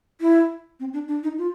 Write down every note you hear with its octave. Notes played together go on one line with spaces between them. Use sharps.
E4
C4
D4
D4
D#4
F4